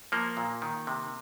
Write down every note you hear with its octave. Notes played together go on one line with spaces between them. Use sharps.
F3 A#3
A#2
D#3
C3